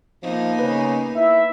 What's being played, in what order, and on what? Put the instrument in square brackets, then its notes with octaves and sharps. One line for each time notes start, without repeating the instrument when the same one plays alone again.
[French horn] F3 [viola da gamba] A#3 B3 D#4
[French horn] C#3 [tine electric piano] B4
[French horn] E4 [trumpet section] E5